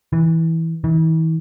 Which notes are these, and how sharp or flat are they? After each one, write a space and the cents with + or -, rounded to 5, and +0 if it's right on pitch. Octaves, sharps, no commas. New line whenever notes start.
E3 -15
E3 -40